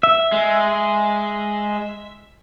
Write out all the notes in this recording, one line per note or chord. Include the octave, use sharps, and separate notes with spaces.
E5
G#3